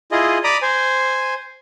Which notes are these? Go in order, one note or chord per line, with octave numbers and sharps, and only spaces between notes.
E4 F4 G#4 D#5
D5 A#5 B5 D6 D#6
C5 G#5